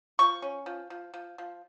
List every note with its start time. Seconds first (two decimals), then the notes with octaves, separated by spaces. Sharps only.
0.19 F3 C#6
0.42 C#4
0.66 F3
0.90 F3
1.14 F3
1.38 F3